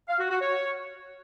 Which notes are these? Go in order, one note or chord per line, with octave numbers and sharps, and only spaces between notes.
F5
F#4
F#4
C#5